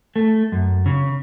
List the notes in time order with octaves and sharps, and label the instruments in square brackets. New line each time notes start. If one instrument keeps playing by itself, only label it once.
[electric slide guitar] A3
F#2
C#3